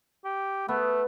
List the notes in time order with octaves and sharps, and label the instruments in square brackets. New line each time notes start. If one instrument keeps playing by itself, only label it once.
[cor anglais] G4
[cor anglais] A3 [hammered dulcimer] B3